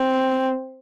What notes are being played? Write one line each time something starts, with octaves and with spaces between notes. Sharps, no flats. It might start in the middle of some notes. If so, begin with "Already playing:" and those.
Already playing: C4